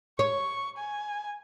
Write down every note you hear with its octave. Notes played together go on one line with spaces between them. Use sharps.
C#5 C#6
G#5